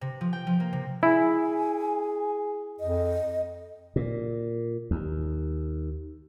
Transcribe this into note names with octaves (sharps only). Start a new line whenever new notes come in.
C3
F3
G5
F3
A#3
C3
E4 G#4 G#5
F2 D#5
A#2
D#2